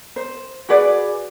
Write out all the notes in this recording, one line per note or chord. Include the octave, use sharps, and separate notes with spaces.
C5
F#4 G#4 B4 D5